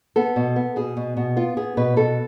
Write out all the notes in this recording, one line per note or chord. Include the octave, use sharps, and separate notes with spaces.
B3 A4
B2
B3
B2 G#4
B2
B2
B3 F4
B3 G#4
B2 B4
B2 A4